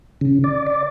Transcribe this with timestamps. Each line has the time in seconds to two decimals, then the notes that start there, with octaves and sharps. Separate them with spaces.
0.21 C#3
0.44 D5
0.67 D5